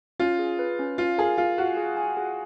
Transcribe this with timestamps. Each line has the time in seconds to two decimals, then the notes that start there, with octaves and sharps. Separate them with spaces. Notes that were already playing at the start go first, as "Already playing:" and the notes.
0.19 C#4 F4
0.39 G#4
0.59 B4
0.79 C#4
0.98 F4 F5
1.18 G#4 A#4
1.38 F4 F5
1.57 F#4 F5
1.77 G#4
1.97 G#5
2.17 G#4